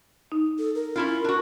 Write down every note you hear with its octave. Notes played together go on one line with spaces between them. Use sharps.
D#4
A4
A#4
C#4 E4 F4
D4 F#4